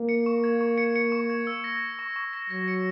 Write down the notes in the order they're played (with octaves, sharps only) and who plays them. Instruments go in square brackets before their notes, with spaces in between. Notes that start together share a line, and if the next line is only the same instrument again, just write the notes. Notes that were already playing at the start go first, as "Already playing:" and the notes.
Already playing: [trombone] A#3
[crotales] C#7
C#6
G#6
C#6
C#7
C#7
C#6
G#6
E6
A#6
C#7
C#6
C#6
A#6
[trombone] F#3 [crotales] A#6
[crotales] C#7